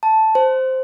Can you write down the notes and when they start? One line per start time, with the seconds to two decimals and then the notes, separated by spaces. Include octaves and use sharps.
0.03 A5
0.35 C5